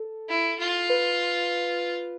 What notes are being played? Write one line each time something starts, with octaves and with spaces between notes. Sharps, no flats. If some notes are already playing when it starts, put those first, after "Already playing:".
Already playing: A4
E4
F4
B4